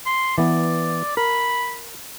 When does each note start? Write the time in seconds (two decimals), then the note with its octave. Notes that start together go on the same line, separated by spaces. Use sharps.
0.06 C6
0.38 E3 B3 D5
1.17 A#4 B5